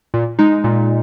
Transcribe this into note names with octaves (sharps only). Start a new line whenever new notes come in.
A#2
G#3 D#4
A#2